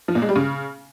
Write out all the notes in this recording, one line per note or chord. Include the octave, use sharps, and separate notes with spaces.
F3
A#2
G#3
G3
C#3